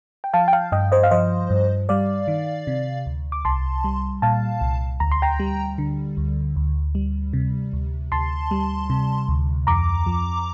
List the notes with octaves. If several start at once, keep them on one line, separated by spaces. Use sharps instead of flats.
G5
F3 F5 A5
G5
F5 A5
G2 D#5 G5
C5 D#5
F5
F3 C5 D#5
G2
G3 D5 F5
D#3
C3
D2
D6
C2 A5 C6
G3
A#2 F5 A5
C2
D2 A#5
C6
G5 A#5
G3
D3
D2
D2
G3
C3
D2
D2 A5 C6
G3
C3
D2
F2 A#5 D6
F3